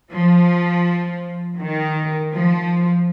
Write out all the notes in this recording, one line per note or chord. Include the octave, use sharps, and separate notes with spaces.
F3
D#3
F3